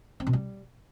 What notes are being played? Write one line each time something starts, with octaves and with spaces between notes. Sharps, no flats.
C4
B2
G3